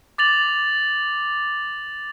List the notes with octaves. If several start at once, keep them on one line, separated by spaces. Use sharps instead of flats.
D6 A6 F7 F#7